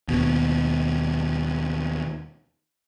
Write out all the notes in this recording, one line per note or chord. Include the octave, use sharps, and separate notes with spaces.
D#2 B2